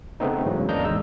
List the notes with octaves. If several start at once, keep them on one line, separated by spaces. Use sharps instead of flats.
C#3 A3 B3 C4 D#4
G#2 C#3 E3 F#3
E2 A#3 D4 D#5 A#5 G6
A1 D#3 G#3 E6